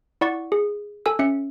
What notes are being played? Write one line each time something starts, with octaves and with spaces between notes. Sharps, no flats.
E4 D5 F#5 C#6 A6
G#4
A4 G#5 E6
C#4 E5 C#7